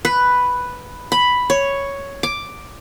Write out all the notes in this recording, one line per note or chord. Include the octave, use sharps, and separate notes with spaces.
B4
B5
C#5
D6